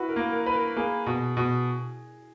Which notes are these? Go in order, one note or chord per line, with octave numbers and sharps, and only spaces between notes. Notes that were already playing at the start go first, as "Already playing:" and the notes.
Already playing: E4 F#4 B4
A#4
A#3
A#4
B4
A#4
A#3 G#4
B2
B2